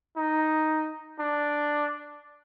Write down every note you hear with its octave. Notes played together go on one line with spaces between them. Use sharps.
D#4
D4